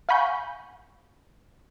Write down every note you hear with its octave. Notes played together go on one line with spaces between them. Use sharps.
F5 F#5 G#5 B5 C#6 G6